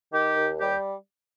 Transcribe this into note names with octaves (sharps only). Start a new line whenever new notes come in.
D#3 G4
D#2
G3 G4